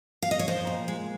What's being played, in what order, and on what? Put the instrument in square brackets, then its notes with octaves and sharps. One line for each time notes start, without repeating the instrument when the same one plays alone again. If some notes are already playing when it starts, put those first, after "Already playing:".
[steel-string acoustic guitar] F5
D#5
C#5
F3 C5
A#2
G#3